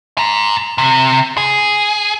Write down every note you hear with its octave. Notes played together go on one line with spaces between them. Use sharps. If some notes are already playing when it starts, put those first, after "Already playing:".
G#5 A#5
C3
G#4